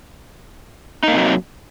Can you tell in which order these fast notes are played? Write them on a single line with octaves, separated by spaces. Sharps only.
D#4 A#3 C3 F#3